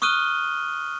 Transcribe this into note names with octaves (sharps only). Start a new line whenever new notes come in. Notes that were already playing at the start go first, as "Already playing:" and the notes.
C#6 D#6 F6 F#6 D#7 G7